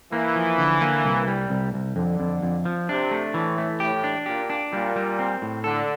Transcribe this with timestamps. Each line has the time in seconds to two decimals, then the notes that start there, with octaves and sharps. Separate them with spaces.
0.12 E3 A#3
0.36 F3
0.58 D3
0.81 A#3
1.04 C2
1.27 G3
1.50 C2
1.74 C2
1.96 F2 D3
2.20 F2
2.42 F2
2.65 F3
2.89 C3 D4
3.11 A3
3.34 A2 E3
3.58 A3
3.80 A2 G4
4.04 D4
4.26 A#2 G4
4.50 D4
4.72 A#2 G3
4.96 G3
5.19 C4
5.42 A2
5.64 D3 A4